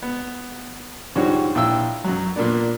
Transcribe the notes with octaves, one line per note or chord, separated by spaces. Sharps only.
B3
G#2 D3 F3 G3 F#4 C#5
A#1 E4 G5 E6
F#2 F#3
A#2 A#3 B3 D4